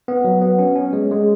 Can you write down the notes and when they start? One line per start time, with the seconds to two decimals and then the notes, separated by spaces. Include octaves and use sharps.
0.08 B3
0.25 F#3
0.42 B3
0.59 C#4
0.76 C#4
0.93 G#3
1.11 G#3